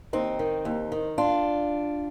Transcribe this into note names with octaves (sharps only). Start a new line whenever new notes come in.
D#2 C4 D#4
D#3
D#2
D#3
D4 F4